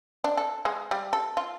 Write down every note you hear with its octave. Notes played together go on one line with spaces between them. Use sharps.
D4
A4
G#3
G3
A4
F4